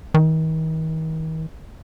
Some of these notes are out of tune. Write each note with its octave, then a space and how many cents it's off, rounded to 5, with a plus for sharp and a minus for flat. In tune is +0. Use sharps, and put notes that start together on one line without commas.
D#3 +40